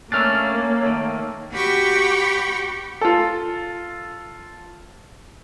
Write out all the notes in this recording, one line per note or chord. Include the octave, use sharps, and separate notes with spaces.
A3 A#3 C#4 D4 C#5 E6 F6 A6
D#3 A3
F#4 G4 G5 B5 C#6
F4 A4